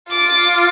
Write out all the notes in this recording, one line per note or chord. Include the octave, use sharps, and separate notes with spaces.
F4 D6